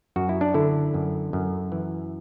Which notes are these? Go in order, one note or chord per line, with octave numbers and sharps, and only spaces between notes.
F#2 F#4
E4
D4
D3 E4
F#2
F#2
E3